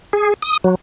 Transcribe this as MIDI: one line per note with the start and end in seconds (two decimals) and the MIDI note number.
0.13 0.34 68
0.42 0.57 87
0.64 0.75 54